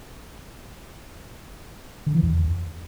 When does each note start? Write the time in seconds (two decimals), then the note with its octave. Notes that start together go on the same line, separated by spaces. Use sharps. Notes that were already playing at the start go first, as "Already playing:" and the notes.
2.06 D3
2.15 E3
2.23 E2